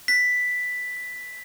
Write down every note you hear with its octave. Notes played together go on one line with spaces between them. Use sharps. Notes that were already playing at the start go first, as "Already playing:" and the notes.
B6